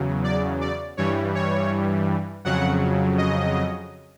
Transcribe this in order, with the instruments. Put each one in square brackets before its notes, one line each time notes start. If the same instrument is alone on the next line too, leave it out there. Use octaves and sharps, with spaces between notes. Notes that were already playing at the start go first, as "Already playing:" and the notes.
Already playing: [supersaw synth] E2 C#3 F#3
D5
D5
G2 E3 G3 C#5
C#5
F2 C#3 F#3 F#5
D#5